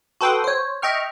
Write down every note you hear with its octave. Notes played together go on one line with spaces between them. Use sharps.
F#4 A4 B4 G5 C6 D#6
C5 C#5
D#5 E5 G5 C#6 F6